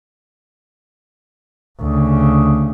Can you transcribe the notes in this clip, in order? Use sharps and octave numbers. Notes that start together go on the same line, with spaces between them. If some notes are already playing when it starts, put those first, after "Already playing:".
D2 C#3